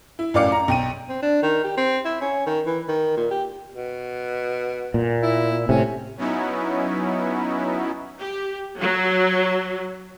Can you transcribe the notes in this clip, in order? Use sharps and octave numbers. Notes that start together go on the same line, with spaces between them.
E4
A1 F#2 D5 F5 D6 C#7
A#5
B1 G5 D#7
C4
D4
D#3
G4
C4
E4
C#4
D#3
E3
D#3
A#2
G4
B2
A#2
E4
A2 C3 C#4
F#3 B3 C#4 D#4 E4
G4
F#3